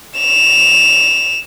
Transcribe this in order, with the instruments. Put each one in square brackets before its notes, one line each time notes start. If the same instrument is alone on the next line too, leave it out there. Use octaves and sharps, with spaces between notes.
[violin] E7 F7